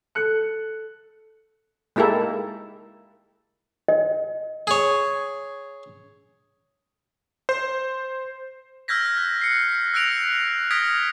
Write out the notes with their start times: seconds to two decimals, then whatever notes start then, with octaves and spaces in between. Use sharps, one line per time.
0.15 A4 F#6 C#7
1.96 G#3 A#3 E4 G4 A4 A#4
3.88 D#5
4.67 G#4 C#5
7.49 C5
8.88 E6 F6 G6 G#6 A#6 B6
9.17 F#6
9.41 C7 C#7
9.94 E6 F#6 A#6 D7 F7
10.71 D#6 F6 G#6 A#6 B6 D7